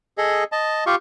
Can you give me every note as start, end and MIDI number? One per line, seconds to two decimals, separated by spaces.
0.18 0.44 68
0.18 0.44 69
0.18 0.44 75
0.52 0.84 75
0.52 0.84 81
0.86 0.95 65
0.86 0.95 67
0.86 0.95 77
0.86 0.95 85